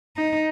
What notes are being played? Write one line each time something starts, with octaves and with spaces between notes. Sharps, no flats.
D#4